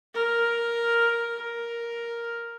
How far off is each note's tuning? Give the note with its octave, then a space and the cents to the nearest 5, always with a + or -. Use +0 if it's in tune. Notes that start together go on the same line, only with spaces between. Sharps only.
A#4 +5
A#4 +5